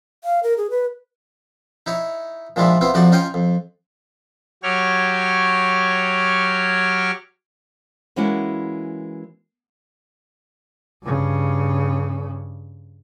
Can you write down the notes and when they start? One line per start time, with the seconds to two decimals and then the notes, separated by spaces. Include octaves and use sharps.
0.24 F5
0.43 A#4
0.58 G#4
0.70 B4
1.86 D#4 E4 C#5
2.56 A#2 D#3 F3 G#3 D4 E4
2.81 B3 C4 E4 F4
2.94 F2 C3 F3 D#4 F#4 D5
3.12 C#4 D#4 F4 C#5 G5 G#5
3.34 F2
4.63 F#3 G4 C#5 F6
8.16 E3 G#3 A#3 C#4 E4 F#4
11.04 G2 C#3